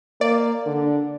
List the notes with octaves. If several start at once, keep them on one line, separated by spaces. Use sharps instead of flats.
A#3 D5
D3